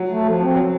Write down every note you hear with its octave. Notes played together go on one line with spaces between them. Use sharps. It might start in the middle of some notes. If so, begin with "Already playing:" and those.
Already playing: F#3
A3
F3
C4
F3 F#3